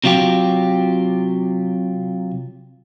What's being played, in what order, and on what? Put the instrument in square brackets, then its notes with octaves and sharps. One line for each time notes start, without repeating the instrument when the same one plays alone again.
[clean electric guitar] C3 F#3 F4 G4